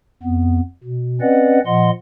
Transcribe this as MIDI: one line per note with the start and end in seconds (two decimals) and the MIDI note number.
0.23 0.60 41
0.23 0.60 59
0.84 1.20 47
1.21 1.60 60
1.21 1.60 61
1.21 1.60 71
1.21 1.60 74
1.21 1.60 75
1.21 1.60 78
1.66 1.90 46
1.66 1.90 53
1.66 1.90 75
1.66 1.90 78
1.66 1.90 84